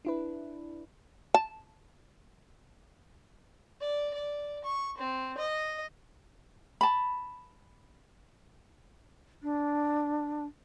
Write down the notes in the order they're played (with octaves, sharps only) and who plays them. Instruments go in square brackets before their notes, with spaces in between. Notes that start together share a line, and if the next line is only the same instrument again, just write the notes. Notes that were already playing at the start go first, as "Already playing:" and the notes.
[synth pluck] D4 E4 B4
[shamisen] A5
[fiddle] D5
D5
C#6
C4
D#5
[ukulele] A5 B5
[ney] D4